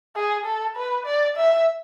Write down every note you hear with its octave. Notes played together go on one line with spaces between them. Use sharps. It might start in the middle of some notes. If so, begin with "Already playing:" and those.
G#4
A4
B4
D5
E5